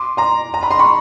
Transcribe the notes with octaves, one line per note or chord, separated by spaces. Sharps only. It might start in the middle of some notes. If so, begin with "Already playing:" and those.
Already playing: C6 D6
A#5 C6
A#5
B5
C6
B5 C#6